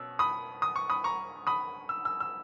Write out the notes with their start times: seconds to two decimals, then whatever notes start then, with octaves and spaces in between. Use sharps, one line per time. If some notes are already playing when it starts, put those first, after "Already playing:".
Already playing: B2 C#4 E6
0.19 B5 D#6
0.62 D#6
0.76 C#6
0.90 B5 D#6
1.04 A#5 C#6
1.47 B5 D#6
1.89 E6
2.05 E6
2.20 E6